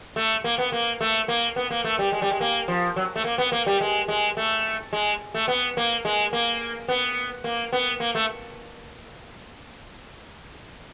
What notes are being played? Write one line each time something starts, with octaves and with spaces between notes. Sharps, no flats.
A3
A#3
B3
A#3
A3
A#3
B3
A#3
A3
G3
G#3
G3
G#3
A#3
F3
F#3
A3
A#3
B3
A#3
G3
G#3
G#3
A3
G#3
A3
B3
A#3
G#3
A#3
B3
A#3
B3
A#3
A3